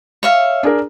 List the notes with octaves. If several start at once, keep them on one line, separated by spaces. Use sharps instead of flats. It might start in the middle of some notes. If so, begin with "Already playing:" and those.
C#5 E5 F5
D4 G#4 A#4